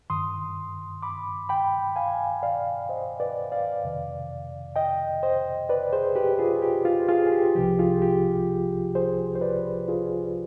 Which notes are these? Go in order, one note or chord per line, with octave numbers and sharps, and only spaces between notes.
G2 D#3 C6 D#6
B5 D6
G5 B5
F5 G#5
D5 F5
C5 D#5
B4 D5
D5 F5
F2 C3 D#3
D#5 G5
C5 D#5
B4 D5
G#4 C5
G4 B4
F4 G#4
G4
F4
F4 G#4
G#4
G4
C2 C3 F3 G4
F4 G#4
G4
G#4 C5
C5
B4 D5
F4 G#4